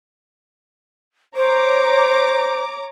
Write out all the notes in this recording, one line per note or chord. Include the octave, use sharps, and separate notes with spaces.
C5 C#5 A#5 D6